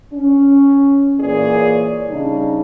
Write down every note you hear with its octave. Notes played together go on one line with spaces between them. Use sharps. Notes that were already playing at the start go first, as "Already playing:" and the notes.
C#4
A#2 E3 G#4 C#5 D5
C#3 G3 D4 D#4